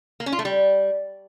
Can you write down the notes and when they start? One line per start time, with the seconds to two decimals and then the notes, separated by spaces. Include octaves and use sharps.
0.20 A#3
0.26 C#4
0.32 F4
0.39 A3
0.45 G3